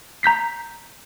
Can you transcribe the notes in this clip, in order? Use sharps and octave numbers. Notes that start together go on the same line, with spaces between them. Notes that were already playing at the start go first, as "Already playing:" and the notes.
A#5 G6 B6 C7